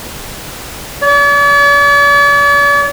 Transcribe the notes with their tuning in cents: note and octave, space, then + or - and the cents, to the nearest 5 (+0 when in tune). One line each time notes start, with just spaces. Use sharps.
D5 -45